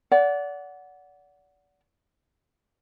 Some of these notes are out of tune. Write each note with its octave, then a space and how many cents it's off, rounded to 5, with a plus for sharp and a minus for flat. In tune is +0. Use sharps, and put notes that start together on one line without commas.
D5 -30 F#5 +0